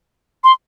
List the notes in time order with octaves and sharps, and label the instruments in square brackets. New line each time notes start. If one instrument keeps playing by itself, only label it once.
[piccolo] C6